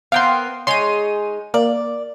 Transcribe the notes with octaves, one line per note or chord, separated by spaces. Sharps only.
B3 C4 A#4 F5 G5 C6
G#3 D#4 C#5 C6 D#7
A#3 D5